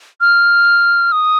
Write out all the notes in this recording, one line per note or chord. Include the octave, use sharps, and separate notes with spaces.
F6
D#6